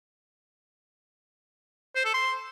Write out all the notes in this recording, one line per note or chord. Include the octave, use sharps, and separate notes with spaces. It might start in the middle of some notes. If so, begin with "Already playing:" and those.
C5
A4
C6